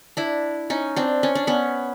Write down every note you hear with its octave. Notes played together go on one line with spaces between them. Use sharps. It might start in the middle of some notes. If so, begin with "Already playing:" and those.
D4 E4
C#4 D#4
C4 D4
C#4
D4
B3 C#4